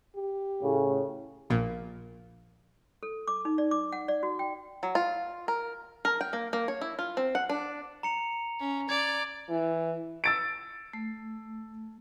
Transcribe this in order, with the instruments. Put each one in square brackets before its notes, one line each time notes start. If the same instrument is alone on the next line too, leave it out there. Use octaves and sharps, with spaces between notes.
[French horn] G4
[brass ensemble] A2 C#3
[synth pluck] A#1 A#2
[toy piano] A4
D6
D#4
D5
D6
F#5
D5
F#4
G5
[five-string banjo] F#3
F4
A#4
A#4
G5
A#3
A#3
C#5
E4
F4
C4
F#5
D4
[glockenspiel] A#5 C#7 F7
[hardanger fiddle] C#4
[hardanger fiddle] D5 [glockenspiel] G#6 F7
[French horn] E3
[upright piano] E6 A6 D7
[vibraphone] A3